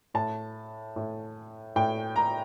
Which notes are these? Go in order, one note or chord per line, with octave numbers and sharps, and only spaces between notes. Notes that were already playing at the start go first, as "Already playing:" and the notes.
A2 A5
A2
A2 G5
A#5